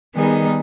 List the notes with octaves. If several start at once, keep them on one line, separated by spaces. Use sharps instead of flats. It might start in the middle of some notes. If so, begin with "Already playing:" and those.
D#3 G3 B3 D#4 G#4